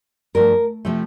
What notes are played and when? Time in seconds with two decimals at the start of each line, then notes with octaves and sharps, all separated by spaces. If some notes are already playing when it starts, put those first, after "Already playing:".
0.35 G2 F3 A3 A#4
0.85 C3 F3 A3